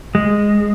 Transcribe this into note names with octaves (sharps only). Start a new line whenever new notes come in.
G#3